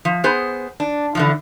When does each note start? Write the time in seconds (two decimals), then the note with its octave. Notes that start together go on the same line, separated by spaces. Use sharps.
0.05 F3
0.24 B3 G#4 C5
0.80 D4
1.15 D3 E3 F3